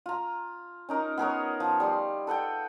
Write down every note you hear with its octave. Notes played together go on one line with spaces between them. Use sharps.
F4 A#5
C#4 D#4 A#4
B3 G#4 A#4 C#5
F3
G3 B5 C6
A4 B4 F#5 G5